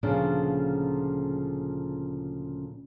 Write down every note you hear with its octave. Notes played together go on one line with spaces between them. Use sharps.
D2 A#2 C#3 F3 C#4 D4